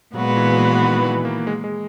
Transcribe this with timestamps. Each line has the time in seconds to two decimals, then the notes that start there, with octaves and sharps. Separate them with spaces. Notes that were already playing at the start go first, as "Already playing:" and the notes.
0.14 A#2 F#3 G#3 B3 F#4 B4
0.37 E3
0.52 F#3
0.59 E3
0.81 D#3
1.03 E3
1.25 A#3
1.47 G#3
1.64 G#3